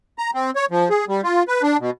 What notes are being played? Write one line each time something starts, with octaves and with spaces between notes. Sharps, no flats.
A#5
C4
C#5
F3
G#4
G3
F4
B4
D4
B2